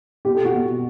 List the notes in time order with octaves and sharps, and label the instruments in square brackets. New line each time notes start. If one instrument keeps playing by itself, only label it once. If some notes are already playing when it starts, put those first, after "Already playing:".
[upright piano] B2 G4
A4
F#4
B2